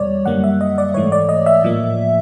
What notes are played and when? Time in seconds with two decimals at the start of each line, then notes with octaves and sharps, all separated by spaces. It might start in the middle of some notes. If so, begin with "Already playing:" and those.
Already playing: E2 B2 G3 C#5 D5
0.25 F#2 D3 G3 A#3 F#5
0.44 E5
0.61 D#5
0.78 D5
0.94 G#2 E3 A3 C#5
1.12 D5
1.29 D#5
1.46 E5
1.64 A2 F3 A#3